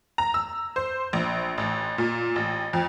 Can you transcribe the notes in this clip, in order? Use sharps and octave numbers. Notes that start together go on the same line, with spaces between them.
A#5
E6
C5
A#1
A1
A#2
A1
F2